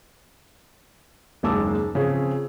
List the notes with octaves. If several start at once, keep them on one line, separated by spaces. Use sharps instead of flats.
F#1 D#2 G#3 A5 D6 E6
C#3 F3 C4 G#4